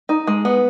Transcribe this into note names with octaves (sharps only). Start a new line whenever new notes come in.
D#4
G#3
B3